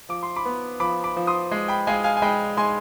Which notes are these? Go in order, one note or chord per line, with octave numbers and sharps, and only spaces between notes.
F3 D6
C6
B5 D6
B3
F3 B5 D6
B5 D6
F3
C6 D#6
G#3
G5 B5
G#3 F5 G#5
F5 G#5
G#5
G#3 G5 B5
G#3 G#5 C6